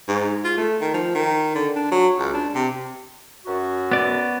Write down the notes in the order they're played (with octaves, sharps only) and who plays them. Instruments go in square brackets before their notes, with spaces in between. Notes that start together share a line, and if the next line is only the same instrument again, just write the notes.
[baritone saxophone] G#2
F4
A3
D#3
F3
D#3
D3
D4
F#3
C#2
D4
C3
[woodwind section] F#2 F#4
[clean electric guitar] B3 D5